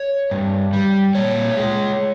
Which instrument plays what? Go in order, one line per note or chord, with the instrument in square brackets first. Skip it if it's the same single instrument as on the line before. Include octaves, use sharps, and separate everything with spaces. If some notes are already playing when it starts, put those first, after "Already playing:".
Already playing: [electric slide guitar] C#5
G2
G3
A#2 C#5
G#3